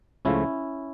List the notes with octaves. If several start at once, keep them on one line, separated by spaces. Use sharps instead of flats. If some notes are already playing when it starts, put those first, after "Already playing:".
C#2 C#3 F3 A3 C#4 E4